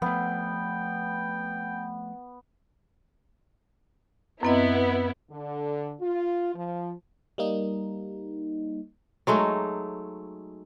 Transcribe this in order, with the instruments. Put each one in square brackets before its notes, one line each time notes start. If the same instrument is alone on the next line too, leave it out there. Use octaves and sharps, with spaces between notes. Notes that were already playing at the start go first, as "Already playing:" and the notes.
[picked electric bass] F3 A3 [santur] B3 [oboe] G5
[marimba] F#2 C4 D#5 [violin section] B3 E4
[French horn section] D3
F4
F3
[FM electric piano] G3 A#3 D#4
[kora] F#3 G#3 A3 D#4